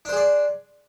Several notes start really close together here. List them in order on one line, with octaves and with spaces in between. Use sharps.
D4 C5 G#4 D5